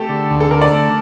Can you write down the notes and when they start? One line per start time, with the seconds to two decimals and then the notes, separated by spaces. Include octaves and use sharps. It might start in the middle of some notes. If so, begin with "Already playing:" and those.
Already playing: A3 G4 A4
0.09 D3
0.30 D2
0.40 A4
0.51 D3 A#4
0.62 D5
0.72 A3